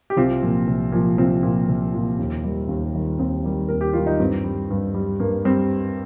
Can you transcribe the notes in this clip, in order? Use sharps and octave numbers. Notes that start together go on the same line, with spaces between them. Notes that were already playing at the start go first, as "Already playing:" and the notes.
G4
C2 C4 F4
A#2 F3
C2
A#2 F3
C2 C4 F4
A#2 F3
C2
A#2 F3
D#2
D#3 G3
D#2
D#3 G3
D#2 C4
D#3 G3
D#2 A#4
G4
D#3 G3 F4
D#4
G2 C4
G3
G2
G3
G2 A#3
G3 C4